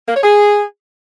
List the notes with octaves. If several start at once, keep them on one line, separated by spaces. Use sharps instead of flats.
A#3
C#5
G#4